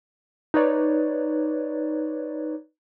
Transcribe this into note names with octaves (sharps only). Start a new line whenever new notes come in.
D#4 B4 C#5 D5